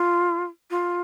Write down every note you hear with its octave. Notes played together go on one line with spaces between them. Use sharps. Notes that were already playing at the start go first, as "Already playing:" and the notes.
Already playing: F4
F4